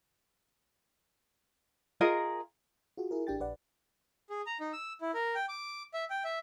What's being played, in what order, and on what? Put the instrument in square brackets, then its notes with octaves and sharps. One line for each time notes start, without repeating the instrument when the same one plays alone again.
[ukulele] F4 G#4 A#4 D#5
[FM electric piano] F4 F#4 G#4
E4 G#4 A#4
A1 D4 G4 G5 A6
A#1 B4 D5 F#5
[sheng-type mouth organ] G#4
A#5
D#4
E6
E4
A#4
G5
D6
E5
G5
E5